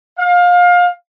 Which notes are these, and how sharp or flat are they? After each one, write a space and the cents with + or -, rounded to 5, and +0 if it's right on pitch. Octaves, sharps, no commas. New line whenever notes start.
F5 +25